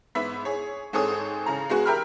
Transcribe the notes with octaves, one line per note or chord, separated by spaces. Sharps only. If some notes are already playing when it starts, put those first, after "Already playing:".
G#2 B3 E5 B5 B6
G#4 C#5
G#2 C4 G#4 A4 C#5 D#6
C#3 G#4 A#5
G#3 B3 F#4 G#4
G4 A#4 E5 G5 B5 F6